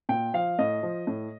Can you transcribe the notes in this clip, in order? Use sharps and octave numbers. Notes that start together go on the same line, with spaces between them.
A#2 G5
F3 F5
A2 D#5
F3
A2